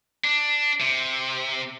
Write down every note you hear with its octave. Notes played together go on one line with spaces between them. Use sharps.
D4
C3